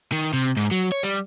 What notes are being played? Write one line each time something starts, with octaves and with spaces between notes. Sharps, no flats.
D#3
C3
G#2
F#3
C#5
G3